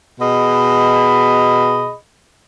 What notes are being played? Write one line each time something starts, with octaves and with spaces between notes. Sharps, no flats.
B2 G#4 D#5 B5